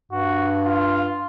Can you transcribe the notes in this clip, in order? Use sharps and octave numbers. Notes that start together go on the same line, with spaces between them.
G2 F#4
F4